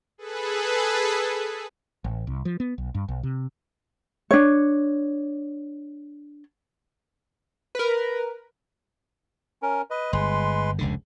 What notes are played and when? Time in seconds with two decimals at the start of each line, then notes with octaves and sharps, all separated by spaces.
0.18 G#4 A4 B4
2.04 A1
2.27 C2
2.45 F3
2.60 B3
2.78 B1
2.95 G2
3.08 B1
3.23 C3
4.31 D4 C#5
7.75 A#4 B4
9.62 C#4 A#4
9.91 B4 D#5
10.13 G1 G#3 B4 C6
10.79 F1 C#2 D3